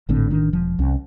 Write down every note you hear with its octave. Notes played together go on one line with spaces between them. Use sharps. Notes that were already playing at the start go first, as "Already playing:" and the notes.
G#1 A2 D3 C4
A1 D#3 D4
E1 F3
C2 C#4